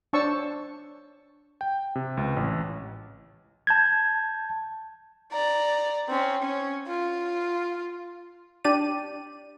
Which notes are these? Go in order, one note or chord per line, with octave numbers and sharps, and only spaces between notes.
D4 C5 C#5 A5 C#6 E6
G5
C3
C#2
A1
A5 G6 G#6
D5 A#5
C4 C#4
C#4
F4
D4 G4 D5 D#7